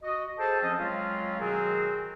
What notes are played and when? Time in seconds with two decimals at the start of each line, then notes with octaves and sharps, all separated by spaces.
0.03 F#4 D#5
0.39 G#4 A4 C5 G5 A5
0.62 F3 C4 C#4 D#5
0.79 F#3 G#3 C4 C#4 F4
1.39 B2 D#3 F#3 C4 F#4 G#4